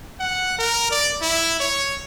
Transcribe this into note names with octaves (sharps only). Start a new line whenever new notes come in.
F#5
A#4
D5
E4
C#5